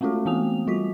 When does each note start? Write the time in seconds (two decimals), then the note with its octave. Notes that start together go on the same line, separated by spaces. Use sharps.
0.01 G#3 A3 C#4 F4 F#4 A4
0.26 E3 A3 B3 C4 D#6 F7
0.67 G3 F4 F#4 B6